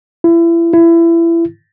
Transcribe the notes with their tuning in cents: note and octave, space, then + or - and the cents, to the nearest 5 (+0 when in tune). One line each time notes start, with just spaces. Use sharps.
E4 +30
E4 +25